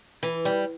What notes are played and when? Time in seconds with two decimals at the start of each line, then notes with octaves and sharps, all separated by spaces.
0.23 E3
0.45 G3